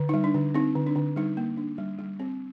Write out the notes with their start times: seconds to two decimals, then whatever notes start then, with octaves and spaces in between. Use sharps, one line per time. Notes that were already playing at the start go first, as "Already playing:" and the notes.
Already playing: D3
0.09 G3 D#4
0.24 D4
0.34 D3
0.55 C4 D#4
0.76 D3
0.86 D4
0.96 D3
1.16 G3 D#4
1.37 A#3
1.57 D4
1.78 G3
1.99 G3
2.20 C4